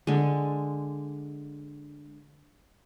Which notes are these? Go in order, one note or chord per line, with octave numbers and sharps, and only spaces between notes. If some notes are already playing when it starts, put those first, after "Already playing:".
D3 G#3